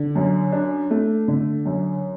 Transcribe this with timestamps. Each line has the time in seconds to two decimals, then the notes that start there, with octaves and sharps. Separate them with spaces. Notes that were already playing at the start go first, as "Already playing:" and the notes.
Already playing: D3
0.16 F#2
0.52 D4
0.90 A3
1.28 D3
1.66 F#2